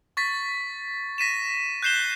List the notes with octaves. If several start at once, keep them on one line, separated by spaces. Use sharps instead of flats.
C#6 A6 B6
A#6 B6 D#7 E7
F#6 G6 C7 E7 G7